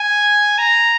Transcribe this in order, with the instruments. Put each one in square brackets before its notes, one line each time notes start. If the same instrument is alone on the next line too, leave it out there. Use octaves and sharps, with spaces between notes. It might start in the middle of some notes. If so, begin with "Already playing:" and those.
Already playing: [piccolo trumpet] G#5
A#5